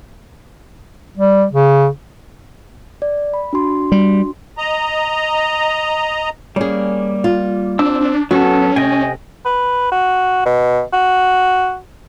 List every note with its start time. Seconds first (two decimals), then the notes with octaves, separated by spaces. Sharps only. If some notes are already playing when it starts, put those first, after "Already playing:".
1.17 G3
1.53 C#3
3.02 D5
3.34 B5
3.53 D4 F#4 C6
3.92 G3
4.58 D#5 A#5
6.56 G3 A#3 C#4 G#4
7.24 F4
7.79 C4 D4 D6 E6
8.01 D4
8.31 F#3 B3 C#4 F#4 A4
8.76 C3 A3 D#5 G5 G#5
9.46 B4
9.92 F#4
10.46 B2
10.93 F#4